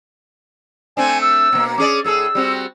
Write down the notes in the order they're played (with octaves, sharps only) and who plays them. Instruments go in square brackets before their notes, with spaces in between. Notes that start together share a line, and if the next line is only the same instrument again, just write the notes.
[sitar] A3 C4 D4 [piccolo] G#5
[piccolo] E6
[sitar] B2 A#3
[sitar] C#4 G#4 D5 [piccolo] D6
[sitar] A2 G#4 A4 [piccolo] E6
[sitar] G3 C4 F#4